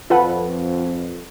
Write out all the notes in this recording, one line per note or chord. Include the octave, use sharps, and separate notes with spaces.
F2 F4 A4 B4 F#5